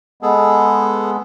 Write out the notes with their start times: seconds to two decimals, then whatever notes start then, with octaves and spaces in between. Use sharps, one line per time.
0.23 G#3 B3 G#4 A4